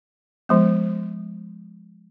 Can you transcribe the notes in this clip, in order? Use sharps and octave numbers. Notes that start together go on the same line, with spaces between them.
F3 G#3 B3